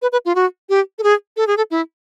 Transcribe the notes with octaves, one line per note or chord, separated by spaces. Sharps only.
B4
B4
F4
F#4
G4
A4
G#4
A4
G#4
A4
E4